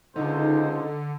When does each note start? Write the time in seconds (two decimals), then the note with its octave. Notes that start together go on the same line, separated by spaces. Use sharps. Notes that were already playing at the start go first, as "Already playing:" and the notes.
0.16 C#2 D3 D#4 C5